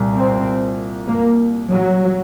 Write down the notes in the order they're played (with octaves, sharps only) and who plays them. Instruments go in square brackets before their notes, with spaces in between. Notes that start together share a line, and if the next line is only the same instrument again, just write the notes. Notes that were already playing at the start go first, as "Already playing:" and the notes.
Already playing: [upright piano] C2 A#2
[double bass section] C4
A#3
F#3